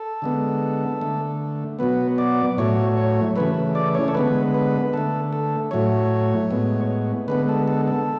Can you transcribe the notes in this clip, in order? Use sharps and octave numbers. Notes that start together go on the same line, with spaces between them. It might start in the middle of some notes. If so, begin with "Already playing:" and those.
Already playing: A4
D3 G#3 B3
D3 A3
B2 F#3 B3 B4
D5
A2 F#3 A3 C#5
C#5
C#3 E3 A3 B4
D5
C#5
A4
D3 G#3 B3 B4
B4
D3 A3 A4
A4
A2 F#3 A3 C#5
A2 G#3 B3
D3 G#3 B3 B4
A4
A4
A4